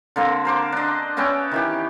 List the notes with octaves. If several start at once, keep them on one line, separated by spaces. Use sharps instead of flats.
D3 A#3 C4
A#4 C5 D6
D4 D#5
B3 C#4 E5 G5
D#3 E3 G4